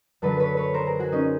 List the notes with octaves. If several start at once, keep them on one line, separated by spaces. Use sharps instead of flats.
F#2 D3 F#3 A4 B4
B4 C#5
B4 C#5
A#4 C5
G#4 A#4
F#4 G#4
C#4 D#4